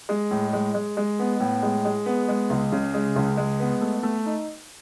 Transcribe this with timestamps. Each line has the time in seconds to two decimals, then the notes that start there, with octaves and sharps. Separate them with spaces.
0.09 G#3
0.31 A2
0.53 G#3
0.74 G#3
0.97 G#3
1.19 B3
1.40 A2
1.63 G#3
1.85 G#3
2.06 B3
2.29 G#3
2.50 C#2
2.72 C#3
2.94 G#3
3.16 C#2
3.37 G#3
3.60 B3
3.81 A3
4.03 A3
4.26 D#4